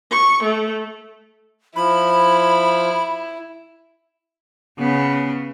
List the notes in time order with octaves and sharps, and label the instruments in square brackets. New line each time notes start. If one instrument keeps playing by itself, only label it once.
[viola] C#6
A3
[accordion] F3 [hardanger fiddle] E4 [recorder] B5
[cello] C#3 B3